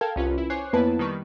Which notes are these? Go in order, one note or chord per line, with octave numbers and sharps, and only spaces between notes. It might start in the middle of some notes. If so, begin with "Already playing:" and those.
A4 A#4 F5 G5 A5 G#6
C2 C#4 F4 B4
E4
C5 C#5 G#5 D6 F#6 C7
F2 A#3 B3 E4 B4 A5
D#3 G3 B4 C#6